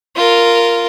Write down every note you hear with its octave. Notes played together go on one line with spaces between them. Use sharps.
F4 A#4